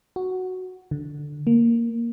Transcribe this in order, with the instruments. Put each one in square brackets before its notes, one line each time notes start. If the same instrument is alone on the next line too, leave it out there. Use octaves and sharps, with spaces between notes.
[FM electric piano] F#4
D3
A#3